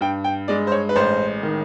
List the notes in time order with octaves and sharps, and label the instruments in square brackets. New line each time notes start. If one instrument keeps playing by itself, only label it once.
[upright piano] G2 G5
G5
G#3 D5
C5
C#5
B4
A1 C5
D#3